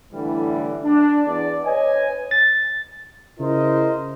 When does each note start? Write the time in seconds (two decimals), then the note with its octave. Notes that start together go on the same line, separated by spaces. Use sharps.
0.12 A2 D3 E3 G3
0.85 D4
1.27 E2 D5
1.65 B4 C#5 D#5 G#5
2.31 A6
3.39 C#3 E4 A#4 C5 D#5